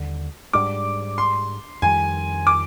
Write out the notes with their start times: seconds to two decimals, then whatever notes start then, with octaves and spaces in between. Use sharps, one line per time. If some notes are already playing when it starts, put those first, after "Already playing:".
Already playing: D#2 D3 G3
0.53 G#2 G3 D4 D6
1.18 C6
1.82 F2 D#3 G3 G#5
2.47 D6